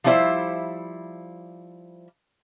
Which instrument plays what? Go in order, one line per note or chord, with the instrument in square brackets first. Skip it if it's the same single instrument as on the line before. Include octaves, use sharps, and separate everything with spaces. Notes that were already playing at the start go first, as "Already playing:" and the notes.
[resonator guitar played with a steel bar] F3 G3 D4 E4 C5 E5